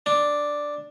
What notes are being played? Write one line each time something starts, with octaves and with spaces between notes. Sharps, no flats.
D4